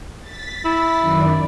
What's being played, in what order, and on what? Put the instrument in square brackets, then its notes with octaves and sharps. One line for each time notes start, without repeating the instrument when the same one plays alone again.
[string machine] A6 B6
[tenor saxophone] E4
[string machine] F#2 D#3 D5